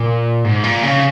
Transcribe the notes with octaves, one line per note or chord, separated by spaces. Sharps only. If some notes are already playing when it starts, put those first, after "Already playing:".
Already playing: A#2
G#2
A#2
C#3